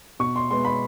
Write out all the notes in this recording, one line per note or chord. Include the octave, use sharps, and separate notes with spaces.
B2 C#6
C6
G#3 B3 C6
B5